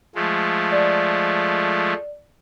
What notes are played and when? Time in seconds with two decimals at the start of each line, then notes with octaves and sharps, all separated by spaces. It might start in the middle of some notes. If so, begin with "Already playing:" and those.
0.15 F3 G#3 A3
0.72 D5